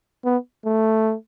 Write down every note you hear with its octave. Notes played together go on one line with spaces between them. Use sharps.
B3
A3